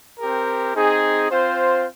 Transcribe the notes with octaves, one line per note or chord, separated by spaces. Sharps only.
C4 G4 A#4
C4 D#4 G#4
C4 F4 C5